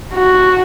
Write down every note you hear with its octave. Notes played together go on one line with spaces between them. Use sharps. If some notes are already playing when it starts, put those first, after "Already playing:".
F#4